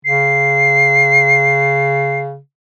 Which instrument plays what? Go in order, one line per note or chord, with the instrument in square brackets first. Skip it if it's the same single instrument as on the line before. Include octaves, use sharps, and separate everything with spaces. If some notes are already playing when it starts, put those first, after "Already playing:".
[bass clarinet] C#3 [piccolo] C7